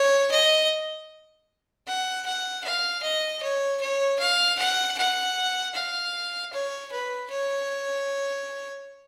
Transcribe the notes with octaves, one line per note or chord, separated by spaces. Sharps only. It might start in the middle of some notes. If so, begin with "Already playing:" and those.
Already playing: C#5
D#5
F#5
F#5
F5
D#5
C#5
C#5
F5
F#5
F#5
F5
C#5
B4
C#5